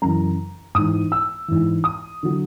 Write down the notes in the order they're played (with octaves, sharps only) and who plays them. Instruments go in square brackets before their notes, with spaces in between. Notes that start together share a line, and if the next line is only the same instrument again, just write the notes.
[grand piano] F#2 C#3 E3 A#5
G#2 E3 D#6
E6
G#2 E3
D#6
D3 F#3